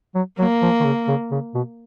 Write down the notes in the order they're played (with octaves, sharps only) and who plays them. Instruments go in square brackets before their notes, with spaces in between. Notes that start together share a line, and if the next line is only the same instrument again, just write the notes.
[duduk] F#3
[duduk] F#3 [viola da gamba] A#3
[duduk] F3
D#3
C#3
C#3
C#3
B2